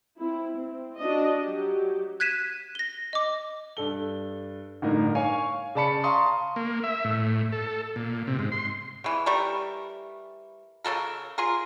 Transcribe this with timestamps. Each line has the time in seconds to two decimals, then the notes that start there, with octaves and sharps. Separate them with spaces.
0.18 C4 E4
0.55 C4
0.97 D4 F#4 D#5
1.42 F#3 G4
2.20 F#6 G#6 B6 D#7 E7
2.75 A#6 G7
3.13 D#5 D6
3.77 G2 A4 G7
4.82 G1 A2 D#4 A#4
5.15 C#5 F5 G#5 C#6
5.75 C#3 D5 A5 B5 C#7
6.04 F5 A5 A#5 C6 C#6 D#6
6.56 A#3
6.84 E5
7.04 A2
7.52 A4
7.96 A#2
8.27 C3
8.39 G#2
8.52 C6
9.04 C#3 E3
9.26 E3 G3 A3 A#4
10.84 C#3 B3 A4 A#4
11.38 F4 G#4 A#4